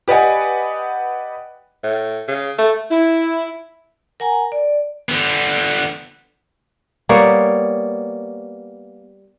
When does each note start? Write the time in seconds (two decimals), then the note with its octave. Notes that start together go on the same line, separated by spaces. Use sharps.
0.08 G4 B4 D5 D#5 F#5 G#5
1.83 A2
2.28 C#3
2.58 A3
2.91 E4
4.20 A#4 F#5 G#5 A#5
4.52 D5
5.09 D3 B3
7.09 G3 A#3 B3 C#5